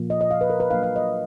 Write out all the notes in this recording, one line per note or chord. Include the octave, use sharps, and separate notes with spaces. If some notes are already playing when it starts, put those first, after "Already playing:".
Already playing: A#2 F3 A#3
D#5
D#5
F5
B4
A#4
B4
F#3 A#3 D4 F4 F5
F5
D#5